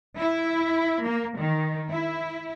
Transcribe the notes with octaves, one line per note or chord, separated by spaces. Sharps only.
E4
A#3
D#3
E4